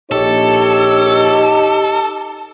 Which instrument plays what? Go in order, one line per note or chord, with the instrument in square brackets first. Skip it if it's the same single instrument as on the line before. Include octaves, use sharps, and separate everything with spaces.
[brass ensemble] A#1 C#5 [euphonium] D#4 [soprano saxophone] G4 [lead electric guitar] A4